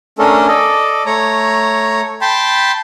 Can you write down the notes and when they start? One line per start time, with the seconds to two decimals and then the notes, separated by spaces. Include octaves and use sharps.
0.18 A3 C#4 D4 A4 A#4
0.48 A4 D5 D#5
1.06 A3 C#5 A#5
2.21 G5 A5 B5 C6